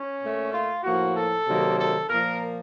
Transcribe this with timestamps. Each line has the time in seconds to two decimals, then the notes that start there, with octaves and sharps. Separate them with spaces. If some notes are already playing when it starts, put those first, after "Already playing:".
Already playing: C#4
0.20 A#2 A3
0.51 F4
0.83 A2 F3 A#3 F#4
1.14 A4
1.46 C3 D#3 F#3 A#3
1.78 A4
2.09 A#2 F3 A#3 A#4